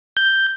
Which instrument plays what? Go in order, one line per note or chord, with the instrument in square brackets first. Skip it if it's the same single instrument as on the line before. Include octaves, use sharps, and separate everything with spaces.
[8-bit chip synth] G6